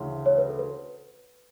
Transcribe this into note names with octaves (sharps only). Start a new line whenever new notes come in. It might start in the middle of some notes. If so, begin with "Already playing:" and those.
Already playing: D2 C#3 E3
C#5
B4
A4
B4